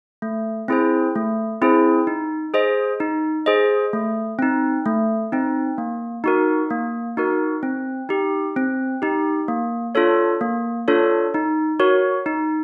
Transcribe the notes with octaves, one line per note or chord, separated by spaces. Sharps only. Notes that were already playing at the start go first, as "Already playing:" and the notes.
A3
C4 E4 G#4 C5
A3
C4 E4 G#4 C5
D#4
G#4 C5 D#5
D#4
G#4 C5 D#5
A3
C4 D#4
A3
C4 D#4
A#3
D#4 F#4 A#4
A#3
D#4 F#4 A#4
C4
D#4 G4
C4
D#4 G4
A#3
D4 F4 A4 C#5
A#3
D4 F4 A4 C#5
D#4
F#4 A#4 C#5
D#4